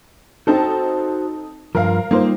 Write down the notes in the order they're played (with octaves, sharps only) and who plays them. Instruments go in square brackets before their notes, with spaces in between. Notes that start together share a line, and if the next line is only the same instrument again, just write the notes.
[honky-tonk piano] C4 D#4 A4 [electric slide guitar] F#4 C5
[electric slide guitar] G2 F3 [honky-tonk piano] A#4 F5
[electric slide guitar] G3 D#4 F4 [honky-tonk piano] A#3 C5